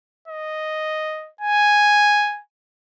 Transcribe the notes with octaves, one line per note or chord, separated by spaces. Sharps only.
D#5
G#5